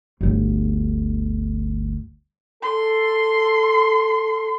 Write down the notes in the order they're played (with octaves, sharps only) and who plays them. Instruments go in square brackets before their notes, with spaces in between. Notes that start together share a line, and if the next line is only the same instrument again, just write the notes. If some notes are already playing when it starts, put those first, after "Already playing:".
[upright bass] G1 D2
[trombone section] A4 [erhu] C6